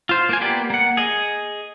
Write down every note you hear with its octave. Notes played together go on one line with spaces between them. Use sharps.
F4 C5
A#3 F4 G#5
A#3 B3 G4 D5
A#3 F#5
G#4 D#5